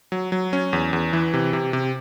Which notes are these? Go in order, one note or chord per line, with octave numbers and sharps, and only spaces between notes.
F#3
F#3
C#4
E2
E2
E3
C3
C3
C3